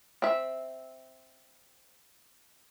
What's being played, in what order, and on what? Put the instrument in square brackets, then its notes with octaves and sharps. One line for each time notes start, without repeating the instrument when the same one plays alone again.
[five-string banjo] C4 E5